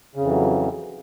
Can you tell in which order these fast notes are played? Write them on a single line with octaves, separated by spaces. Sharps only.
C#3 F2 E3 F#3